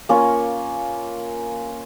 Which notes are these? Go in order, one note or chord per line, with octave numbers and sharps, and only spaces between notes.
A#3 C#4 F4